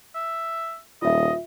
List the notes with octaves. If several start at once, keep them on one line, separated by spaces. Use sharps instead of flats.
E5
D#1 F4 D#5 E5